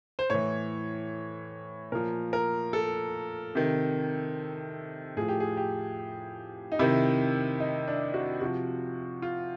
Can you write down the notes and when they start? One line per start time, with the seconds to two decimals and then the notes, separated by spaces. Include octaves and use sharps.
0.19 C5
0.30 A2 E3 C#5
1.92 A#2 F3 A#4
2.33 A#4
2.73 A4
3.55 C3 D#3
5.17 A2 F3 G#4
5.28 G4
5.40 G#4
5.57 G4
6.72 D#4
6.79 C3 D#3 E4
7.60 D#4
7.88 D4
8.14 F#4
8.41 C3 F3 F#4
9.22 F4